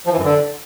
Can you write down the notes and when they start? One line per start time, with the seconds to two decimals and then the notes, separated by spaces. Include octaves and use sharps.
0.06 F3
0.12 E3
0.18 F#2
0.24 D3